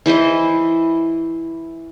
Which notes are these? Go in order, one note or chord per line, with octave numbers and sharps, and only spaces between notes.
E3 E4 C5 D#5